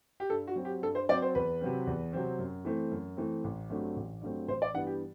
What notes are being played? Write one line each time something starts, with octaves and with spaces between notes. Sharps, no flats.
G4
G2 A4
F#4
F#3 C4
G4
G2 A4
C5
F#3 C4 D5
C5
E2 B4
C3 F#3 C4
E2
C3 F#3 C4
F#2
E3 A3 C4
F#2
E3 A3 C4
A1
G2 F#3 A3 C4
A1
G2 F#3 A3 C4
A1 C5
D5
G2 E3 G3 B3 F#5
G4